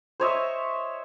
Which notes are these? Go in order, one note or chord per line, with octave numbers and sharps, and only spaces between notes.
C5 C#5 D#5 E5